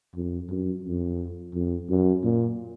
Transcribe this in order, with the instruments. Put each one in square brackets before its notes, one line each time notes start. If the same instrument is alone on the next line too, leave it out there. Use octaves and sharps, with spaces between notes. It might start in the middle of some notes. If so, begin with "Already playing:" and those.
[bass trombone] F2
F#2
F2
F2
F#2
A#2